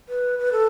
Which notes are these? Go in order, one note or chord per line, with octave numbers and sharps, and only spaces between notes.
B4
B4
A4